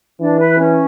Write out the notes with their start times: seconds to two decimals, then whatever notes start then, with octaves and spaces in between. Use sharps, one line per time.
0.20 E3 D4
0.39 B4
0.58 C#4